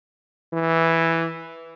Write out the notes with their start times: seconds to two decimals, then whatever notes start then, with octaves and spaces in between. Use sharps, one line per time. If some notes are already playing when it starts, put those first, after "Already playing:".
0.53 E3